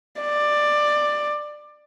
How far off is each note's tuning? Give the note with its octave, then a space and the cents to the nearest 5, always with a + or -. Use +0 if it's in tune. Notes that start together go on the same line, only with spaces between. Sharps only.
D5 +15